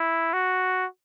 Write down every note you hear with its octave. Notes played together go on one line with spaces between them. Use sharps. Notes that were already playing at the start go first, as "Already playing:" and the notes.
Already playing: E4
F#4